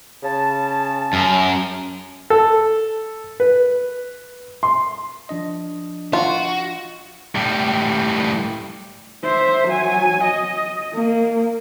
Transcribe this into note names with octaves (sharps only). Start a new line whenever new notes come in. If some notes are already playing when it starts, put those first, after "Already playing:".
C#3 A5
F#2
A4
B4
C6
F3 D4 D#5
F4 F#4
A2 G3
C5 E5
F#3 G#5
D#5
A#3